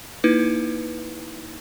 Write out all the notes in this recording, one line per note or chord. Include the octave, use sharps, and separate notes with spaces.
A#3 D#4 E4 B4